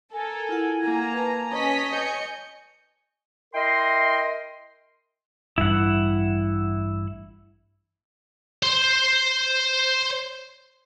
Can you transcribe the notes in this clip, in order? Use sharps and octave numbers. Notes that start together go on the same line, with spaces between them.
A4 A#4 G#5
E4 F4 F#5
A#3 A#5
B4 A5
C#4 C#5 D#5 B6
G#5 G6 C#7
E4 A#4 D#5 G5 C6
A1 G2 E4 F#5
C5 C6